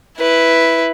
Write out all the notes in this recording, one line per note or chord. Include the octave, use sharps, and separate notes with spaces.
E4 B4